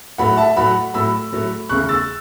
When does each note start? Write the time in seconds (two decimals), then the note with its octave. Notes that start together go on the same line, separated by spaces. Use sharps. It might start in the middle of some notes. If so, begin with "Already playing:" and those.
0.18 A2 F#3 A3 F#5 B5
0.37 E5 A5
0.57 A2 F#3 A3 F#5 B5
0.94 A2 F#3 A3 B5 E6
1.32 A2 F#3 A3
1.69 E2 C#3 A3 C#6 F#6
1.89 E6 A6